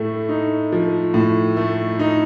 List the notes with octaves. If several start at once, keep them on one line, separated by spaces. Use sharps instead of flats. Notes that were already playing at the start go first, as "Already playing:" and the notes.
Already playing: A2 A3
D#4
F3
A2
A3
D#4